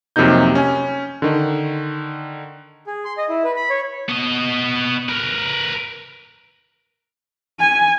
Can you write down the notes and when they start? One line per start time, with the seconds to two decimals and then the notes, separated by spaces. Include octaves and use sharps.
0.16 F2 C3 F#3 A#3 D#4 G6
0.55 C#4 G#5
1.22 D3 D#3
2.87 G#4
3.05 C6
3.18 D#5
3.29 E4
3.44 B4
3.56 B5
3.70 C#5
4.09 B3 D#5
5.09 A#4 B4
7.60 G#5